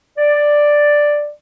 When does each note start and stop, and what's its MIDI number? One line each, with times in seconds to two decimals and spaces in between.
0.18 1.30 74